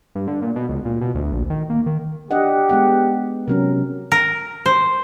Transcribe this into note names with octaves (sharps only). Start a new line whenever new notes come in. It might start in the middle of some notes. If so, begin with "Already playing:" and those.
G2
D3
A#2
B2
C#2
A#2
B2
D2
A#1
D#3
A#3
D#3
D4 G4 D#5 F#5
G#3 B3 F#5
C3 F#3 C#4 A#4
A#4
C5